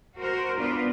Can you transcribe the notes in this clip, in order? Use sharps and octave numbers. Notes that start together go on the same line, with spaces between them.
F#4 A#4 C5
B3 D4 F4 B4